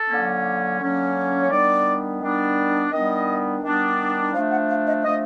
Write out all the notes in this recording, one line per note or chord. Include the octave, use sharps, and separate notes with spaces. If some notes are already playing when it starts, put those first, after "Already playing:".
Already playing: A4
D3 F#3 A#3 C#4
D3 F#3 A#3 C#4
C#5
D#3 G3 B3 D4 D5
D#3 G3 B3 D4
D#3 G3 B3 D4 D#5
D#3 G3 B3 D4
F3 A3 D4 F5
F#5
F5
D#5
F3 A3 D4 D#5